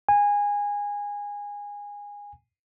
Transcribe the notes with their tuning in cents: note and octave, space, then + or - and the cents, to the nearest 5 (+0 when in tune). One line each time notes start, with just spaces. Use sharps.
G#5 -20